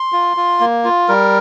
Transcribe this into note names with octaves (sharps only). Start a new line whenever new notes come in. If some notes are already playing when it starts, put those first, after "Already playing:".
Already playing: C6
F4
F4
A#3
F4
G3 A#4